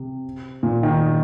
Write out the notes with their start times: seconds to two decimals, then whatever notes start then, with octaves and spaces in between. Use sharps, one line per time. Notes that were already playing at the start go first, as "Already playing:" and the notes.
Already playing: C3
0.63 A#2
0.83 D#3